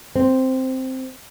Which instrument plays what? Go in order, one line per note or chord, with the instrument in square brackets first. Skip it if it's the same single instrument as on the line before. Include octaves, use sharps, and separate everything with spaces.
[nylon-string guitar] C4